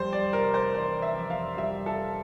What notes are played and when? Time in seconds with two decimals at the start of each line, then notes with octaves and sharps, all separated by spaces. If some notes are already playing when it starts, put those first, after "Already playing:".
Already playing: F2 G3 C5
0.13 D5
0.33 F1 A#4
0.54 C5
0.74 E3 D5
1.02 E5
1.16 F2
1.30 F5
1.57 G3 E5
1.86 A4